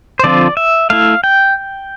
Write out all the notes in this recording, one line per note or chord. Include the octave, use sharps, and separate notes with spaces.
C5
D3 F3 C4 F4 D5
E5
A3 E4 F5
G5